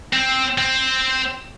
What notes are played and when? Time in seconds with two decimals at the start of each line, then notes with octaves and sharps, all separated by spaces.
0.13 C4
0.58 C4